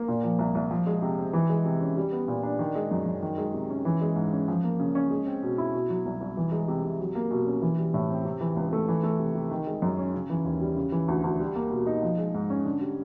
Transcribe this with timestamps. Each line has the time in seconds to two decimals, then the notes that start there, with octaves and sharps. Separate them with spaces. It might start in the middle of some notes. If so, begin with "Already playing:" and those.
Already playing: A#3
0.08 A#2
0.23 F3
0.39 C2
0.55 C2
0.71 F3
0.87 G#3
1.02 C3
1.18 C4
1.33 E3
1.50 G#3
1.65 C3
1.81 C#4
1.97 G3
2.12 B3
2.28 A#2
2.43 D4
2.59 D#3
2.76 G#3
2.91 F#2
3.06 F#2
3.22 D#3
3.38 G#3
3.54 C3
3.70 C#4
3.85 E3
4.01 G#3
4.16 G#2
4.33 C#4
4.48 F3
4.64 A#3
4.79 C#3
4.95 C#4
5.11 G#3
5.26 C4
5.43 B2
5.58 E4
5.73 B2
5.90 F#3
6.06 C2
6.21 C2
6.37 E3
6.52 G#3
6.68 C3
6.84 C3
7.00 F#3
7.15 A#3
7.31 B2
7.47 C#4
7.62 E3
7.78 G3
7.94 A2
8.10 C4
8.25 C3
8.41 E3
8.56 C#2
8.73 A3
8.88 E3
9.04 A3
9.19 C3
9.35 C3
9.51 D#3
9.67 G#3
9.82 F#2
9.99 C#4
10.14 C#3
10.30 E3
10.45 D#2
10.61 G3
10.77 C#3
10.92 E3
11.08 D2
11.24 D2
11.40 G3
11.56 A#3
11.71 B2
11.86 D#4
12.02 F3
12.18 G#3
12.34 G#2
12.50 C#4
12.65 D3
12.81 G3